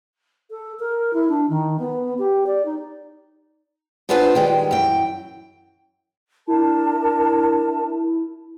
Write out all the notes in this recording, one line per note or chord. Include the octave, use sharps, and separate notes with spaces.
A4
A#4
E4
D4
D#3
B3
G4
D5
D#4
B3 D4 F4 G#4 B4 C5
D#3 G3 G#3
F#2 E3 G5
D4 E4 A#4 A5